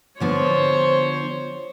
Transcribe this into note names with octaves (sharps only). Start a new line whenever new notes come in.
D3 F3 B3 C5 C#5